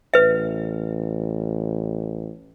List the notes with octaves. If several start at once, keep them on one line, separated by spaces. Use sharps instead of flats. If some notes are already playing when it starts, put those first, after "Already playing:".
A1 B4 E5